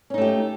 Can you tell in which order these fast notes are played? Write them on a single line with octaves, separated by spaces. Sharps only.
C#4 D#4 A3 G4